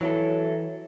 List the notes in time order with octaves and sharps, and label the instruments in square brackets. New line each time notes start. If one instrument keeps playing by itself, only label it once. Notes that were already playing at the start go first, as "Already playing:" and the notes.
[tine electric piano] E3 [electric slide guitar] F#3 E4 A4 [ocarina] C#5